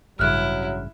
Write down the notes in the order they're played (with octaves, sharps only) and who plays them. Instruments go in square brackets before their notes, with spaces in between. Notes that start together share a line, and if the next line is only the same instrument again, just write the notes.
[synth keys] A1 G2 C#3 [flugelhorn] F#3 [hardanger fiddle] E4 [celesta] F6 F#6